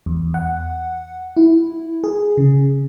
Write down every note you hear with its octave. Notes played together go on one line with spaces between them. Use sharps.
E2
F#5
E4
G#4
C#3